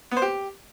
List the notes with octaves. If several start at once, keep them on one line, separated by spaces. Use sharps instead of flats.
B3
C5
G4